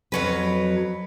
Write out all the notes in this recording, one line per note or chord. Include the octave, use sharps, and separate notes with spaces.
F2 F#3 B4